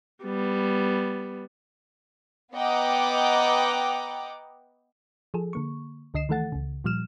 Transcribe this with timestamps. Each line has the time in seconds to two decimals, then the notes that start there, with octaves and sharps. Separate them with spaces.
0.24 G3 B3
2.55 B3 D#5 F#5 G5 A#5 D6
5.34 F3 G#4 A4
5.53 D3 A#3 C#6
6.14 C#2 D3 D#5 C7 E7
6.29 D#3 E3 A3 A4 F#5 A6
6.52 C#2 C#3
6.84 A#2 F3 G3 F6 E7